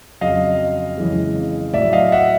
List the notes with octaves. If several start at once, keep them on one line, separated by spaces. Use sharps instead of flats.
F2 C#3 F#3 D#5 F5
F2 C#3 E3 G#3
A2 F#3 D5 E5
D#5 F5
E5 F#5